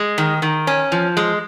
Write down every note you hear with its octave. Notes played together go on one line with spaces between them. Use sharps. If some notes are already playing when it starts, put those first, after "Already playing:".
Already playing: G#3
D#3
D#3
C#4
F3
G#3